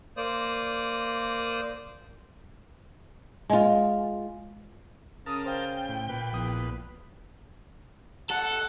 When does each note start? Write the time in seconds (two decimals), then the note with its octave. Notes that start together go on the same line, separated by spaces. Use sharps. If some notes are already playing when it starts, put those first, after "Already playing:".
0.17 A#3 C5 D5 D#6
3.50 G#3 F4
5.26 C#3 A#4 A5 D#6
5.45 C5 F5 G5
5.88 A2
6.09 A#2 B4
6.33 A#1 E2 D#6
8.30 A4 F#5